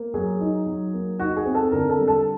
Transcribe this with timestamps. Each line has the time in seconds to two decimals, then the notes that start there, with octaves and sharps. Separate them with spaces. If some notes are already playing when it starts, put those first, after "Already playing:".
Already playing: A#3
0.14 F#3 G#4
0.41 D#4
0.66 F#3
0.94 A#3
1.19 D#4 F#4
1.36 G#4
1.46 C4
1.55 A4
1.72 D3 A#4
1.90 A4
1.98 G3
2.08 A4